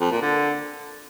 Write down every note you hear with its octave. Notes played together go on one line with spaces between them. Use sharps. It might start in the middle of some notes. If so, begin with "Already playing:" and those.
F2
A#2
D3